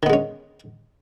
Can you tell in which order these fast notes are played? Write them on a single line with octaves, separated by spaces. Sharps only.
D#3 B3 G#3 C#4